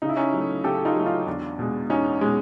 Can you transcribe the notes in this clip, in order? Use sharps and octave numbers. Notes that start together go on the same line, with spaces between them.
C#3 D#4
E4
C#4 D#4
F#3 A3
C#3 G4 A4
D#4 F4
F#3 A3
D#4 F4
E2 D4
B2 G#3
E2 C#4 D#4
B2 G#3